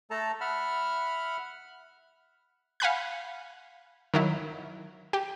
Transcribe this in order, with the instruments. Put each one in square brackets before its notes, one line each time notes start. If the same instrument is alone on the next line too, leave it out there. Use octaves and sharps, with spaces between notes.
[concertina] A3 A4 A5 A#5
E5 F#5 B5 F6
[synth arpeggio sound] F5 F#5 G#5 B5 F#6 G6
D#3 F#3 E4
G4